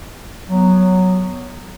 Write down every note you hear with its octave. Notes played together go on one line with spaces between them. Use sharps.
F#3 B3